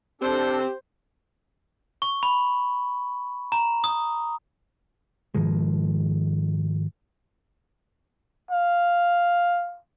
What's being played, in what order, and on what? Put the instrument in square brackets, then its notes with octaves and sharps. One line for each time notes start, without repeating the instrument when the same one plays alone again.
[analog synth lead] C4 [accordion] D4 A4 [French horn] G4 [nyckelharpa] C5
[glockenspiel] C#6
B5
A#5
D#6
[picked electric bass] G#2 D#3 F3 G#3
[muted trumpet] F5